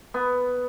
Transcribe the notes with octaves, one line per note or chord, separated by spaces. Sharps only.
B3